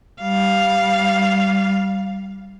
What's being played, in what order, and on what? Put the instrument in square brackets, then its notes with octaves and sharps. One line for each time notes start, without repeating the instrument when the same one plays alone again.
[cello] G3 F5